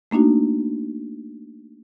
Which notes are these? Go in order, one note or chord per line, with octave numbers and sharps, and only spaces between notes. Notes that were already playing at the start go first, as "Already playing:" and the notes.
A3 A#3 D4 D#4 F#4